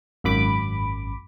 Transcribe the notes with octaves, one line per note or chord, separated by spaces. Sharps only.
G#1 F#2 B5 D6